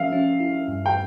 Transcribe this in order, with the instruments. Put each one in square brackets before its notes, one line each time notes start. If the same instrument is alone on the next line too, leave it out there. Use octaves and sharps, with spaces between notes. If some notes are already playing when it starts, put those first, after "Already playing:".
Already playing: [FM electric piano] F3 C#4 [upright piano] E5 F5
[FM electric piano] C#4
E4
G2
[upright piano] G5